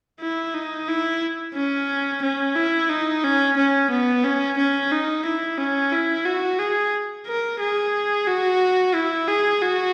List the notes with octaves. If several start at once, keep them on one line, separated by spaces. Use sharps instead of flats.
E4
D#4
E4
C#4
C#4
E4
D#4
C#4
C#4
B3
C#4
C#4
D#4
E4
C#4
E4
F#4
G#4
A#4
G#4
F#4
E4
G#4
F#4